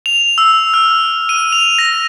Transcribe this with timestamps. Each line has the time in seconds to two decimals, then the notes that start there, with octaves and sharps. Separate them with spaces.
0.06 F7
0.38 E6
0.74 F6
1.29 D#7
1.52 F7
1.78 A#6